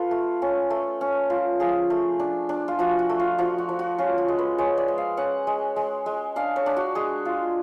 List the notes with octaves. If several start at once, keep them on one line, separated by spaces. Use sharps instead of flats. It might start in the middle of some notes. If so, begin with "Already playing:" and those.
Already playing: F4 A4 B4
A3
C#4
A3
C#4
F4
F3 G#4
A3
D4
D4
F4
F3 F#4
F#4
A3
F4
F3 F#4
F#4
F3
F#4
C#4 F4
F#4
G#3
B4
G#3 C#5
D5
G#3
F5
C#4 F#5
G#3
G#3
G#3
D4 F5
C#5
D4
F#4
G#3 G#4
F4